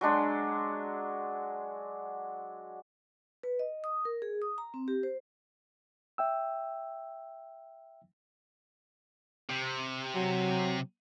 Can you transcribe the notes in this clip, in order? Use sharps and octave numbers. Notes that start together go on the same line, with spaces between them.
F#3 G#3 D4 C6
B4
D#5
D#6
A#4
G#4
D#6
A#5
C4
G4
C5
E5 G5 E6
C3
F#3